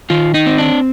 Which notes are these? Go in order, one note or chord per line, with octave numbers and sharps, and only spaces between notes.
D#3 F4
D#4
C4
D4